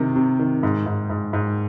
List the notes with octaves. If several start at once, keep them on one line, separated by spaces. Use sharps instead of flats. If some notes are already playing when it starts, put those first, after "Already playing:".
Already playing: C3 D#3
C3
D#3
G#2
G#2
G#2
G#2